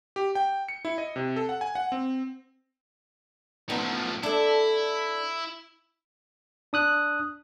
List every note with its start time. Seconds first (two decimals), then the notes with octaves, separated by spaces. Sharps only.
0.16 G4
0.35 G5
0.69 C#7
0.85 E4
0.98 D#5
1.16 C3
1.36 A4
1.49 F#5
1.61 G#5
1.75 F#5
1.92 C4
3.70 A2 F3 B3 D#4
4.23 D4 E4 A4
6.73 D4 D#6 F#6